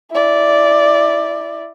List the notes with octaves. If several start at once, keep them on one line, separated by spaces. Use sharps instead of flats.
E4 D5